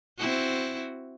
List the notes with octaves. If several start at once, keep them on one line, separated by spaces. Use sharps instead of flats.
C4 E4 F#4